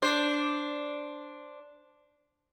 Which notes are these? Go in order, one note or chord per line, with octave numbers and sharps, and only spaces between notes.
D4 C5